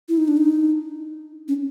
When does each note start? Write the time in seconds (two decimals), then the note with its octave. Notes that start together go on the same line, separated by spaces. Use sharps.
0.09 E4
0.17 D#4
0.28 D4
0.37 D#4
1.48 C#4